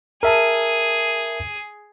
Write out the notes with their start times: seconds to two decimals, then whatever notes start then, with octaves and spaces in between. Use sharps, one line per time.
0.23 G#4 A#4 E5 A5